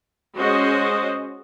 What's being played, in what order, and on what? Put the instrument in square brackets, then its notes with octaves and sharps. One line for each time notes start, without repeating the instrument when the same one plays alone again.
[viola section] G#3 C#4 F#4 C5 D#5